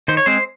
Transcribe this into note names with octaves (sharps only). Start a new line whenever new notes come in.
D#3 C5
C#5
G#3 C4 C5